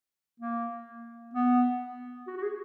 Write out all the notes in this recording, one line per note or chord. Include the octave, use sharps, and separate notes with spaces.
A#3
B3
F#4
F#4
G#4